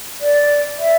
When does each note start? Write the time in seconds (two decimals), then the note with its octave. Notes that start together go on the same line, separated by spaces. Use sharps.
0.20 D5
0.79 E5